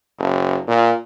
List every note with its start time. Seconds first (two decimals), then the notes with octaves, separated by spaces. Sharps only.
0.19 F#1
0.67 A#2